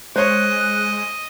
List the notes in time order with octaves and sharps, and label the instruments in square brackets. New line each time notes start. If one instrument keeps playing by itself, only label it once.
[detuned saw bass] G#3 [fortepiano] C5 C#5 [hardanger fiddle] D#5 [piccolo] F#6